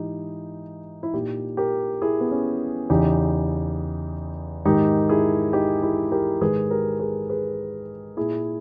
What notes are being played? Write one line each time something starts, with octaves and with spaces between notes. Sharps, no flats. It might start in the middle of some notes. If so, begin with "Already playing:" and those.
Already playing: G#2 E3 D#4 G4
E4
A#2 D#4 G4
G4 A#4
E4 G#4
B3
C#4
E2 C#3 E3 D#4 G4
G#2 D#3 D#4 G4
E4 G#4
D#4 G4
E4 G#4
G4 A#4
G#2 D#3 G#4 B4
G4 A#4
G#4 B4
G#4 B4
A#2 E4 G#4